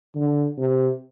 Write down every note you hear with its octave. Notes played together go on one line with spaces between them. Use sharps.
D3
C3